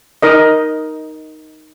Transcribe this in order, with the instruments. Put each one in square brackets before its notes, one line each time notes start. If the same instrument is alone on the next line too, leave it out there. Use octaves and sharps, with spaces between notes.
[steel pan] D#4 A#4 D#5